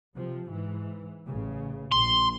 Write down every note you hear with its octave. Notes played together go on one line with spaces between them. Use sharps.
C3 F3
G#2 E3
A1 C#3
A#1 C6